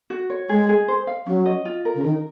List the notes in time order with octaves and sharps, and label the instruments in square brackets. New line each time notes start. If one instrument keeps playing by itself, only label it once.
[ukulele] F#4
C#5
[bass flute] G#3 [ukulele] G#4
[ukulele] G#4
C5
F5
[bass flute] F#3 [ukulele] C#4
[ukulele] D#5
F4
A#4
[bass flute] C#3
[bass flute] D#3 [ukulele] A#4